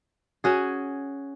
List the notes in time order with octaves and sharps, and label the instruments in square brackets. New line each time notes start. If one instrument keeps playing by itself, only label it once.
[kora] C#4 F#4 G#4